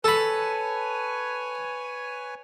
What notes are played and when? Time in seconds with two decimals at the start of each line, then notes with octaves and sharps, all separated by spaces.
0.04 A4 B4 C#5 G#5 B5